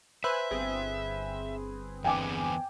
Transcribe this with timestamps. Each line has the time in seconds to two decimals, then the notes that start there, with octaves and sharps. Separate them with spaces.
0.24 B4 C5 E5 G#5 E6 F#6
0.51 G1 C4 G#4
2.04 E2 D3 B3 G5 G#5 D6